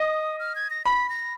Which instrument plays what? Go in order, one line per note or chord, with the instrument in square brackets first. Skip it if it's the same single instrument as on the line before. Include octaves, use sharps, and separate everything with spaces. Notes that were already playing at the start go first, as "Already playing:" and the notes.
Already playing: [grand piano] D#5 [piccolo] D#6
[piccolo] F6
G#6
A#6
[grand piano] B5 [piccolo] B6
[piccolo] A#6